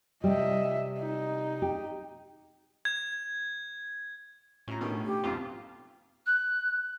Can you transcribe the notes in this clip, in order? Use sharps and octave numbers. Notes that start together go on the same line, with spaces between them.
C3 G3 D#5 E5
D#4
G4
G#6
A2 C#4 F4 A#5 B5
B2 D#3 A3 C#4 D4 A4
G4
B1 F2 G#2 C#4 F4
F#6